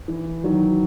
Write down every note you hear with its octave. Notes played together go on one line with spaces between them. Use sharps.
E3
D#3 F#3